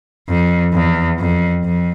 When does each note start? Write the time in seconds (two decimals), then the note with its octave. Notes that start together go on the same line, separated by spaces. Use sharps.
0.28 F2
0.74 E2
1.19 F2
1.64 F2